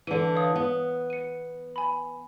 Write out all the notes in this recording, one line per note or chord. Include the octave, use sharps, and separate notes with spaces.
D3 E3 D#7
C#5 F5 D#6
B3
C#7 D#7
G#5 B5